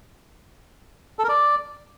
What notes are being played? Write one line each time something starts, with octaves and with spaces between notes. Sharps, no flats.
A4
A#4
D5